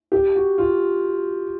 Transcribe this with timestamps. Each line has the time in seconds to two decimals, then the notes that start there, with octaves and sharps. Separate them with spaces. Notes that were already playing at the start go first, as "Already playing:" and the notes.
0.12 G4
0.35 F#4
0.58 F4